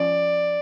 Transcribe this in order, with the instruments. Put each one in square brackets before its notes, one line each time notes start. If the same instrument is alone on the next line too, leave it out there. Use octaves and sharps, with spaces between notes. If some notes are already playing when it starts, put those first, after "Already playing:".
Already playing: [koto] F3 C#4 [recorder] D5